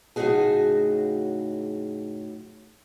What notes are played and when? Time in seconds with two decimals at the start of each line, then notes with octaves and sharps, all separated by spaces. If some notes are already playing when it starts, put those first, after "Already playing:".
0.16 A2 C#3 F#3 D#4 F#4 G#4